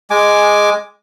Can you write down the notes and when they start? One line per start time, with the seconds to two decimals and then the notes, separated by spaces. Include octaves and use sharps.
0.10 G#3 G#5 D6